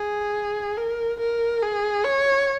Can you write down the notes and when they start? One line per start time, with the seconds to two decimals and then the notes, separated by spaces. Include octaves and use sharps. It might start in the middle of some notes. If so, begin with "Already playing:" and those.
Already playing: G#4
0.77 A#4
1.20 A#4
1.62 G#4
2.04 C#5